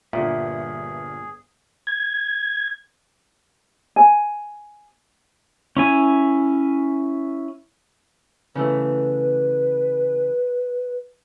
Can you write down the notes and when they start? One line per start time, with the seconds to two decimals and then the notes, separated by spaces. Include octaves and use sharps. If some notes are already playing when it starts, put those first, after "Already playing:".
0.13 G1 G2 A#2 G#4 E5 F#5
1.87 G#6
3.96 G#5
5.77 C#4 E4 G#5
8.55 C#3 E3 A3 B4